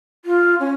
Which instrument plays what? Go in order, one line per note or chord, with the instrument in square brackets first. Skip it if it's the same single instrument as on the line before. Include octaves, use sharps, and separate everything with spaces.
[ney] F4
C#4